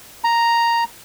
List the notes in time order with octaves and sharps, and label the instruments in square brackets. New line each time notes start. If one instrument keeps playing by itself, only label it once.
[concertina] A#5